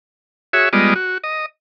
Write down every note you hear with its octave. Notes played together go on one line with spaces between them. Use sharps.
F#4 G#4 C#5 E5
G3 G#3 B3 F4 D5 D#5
F#4
D#5